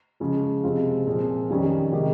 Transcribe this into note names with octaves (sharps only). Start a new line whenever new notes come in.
C#3 F3 G#3
C3 F3 G#3 C4 F4
A#2 F3 C4 F4 G#4
F2 D#3 G3 C#4
C3 D#3 G#3 D#4 G4